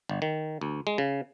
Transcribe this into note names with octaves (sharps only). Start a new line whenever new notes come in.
G1
D#3
D2
G#3
C#3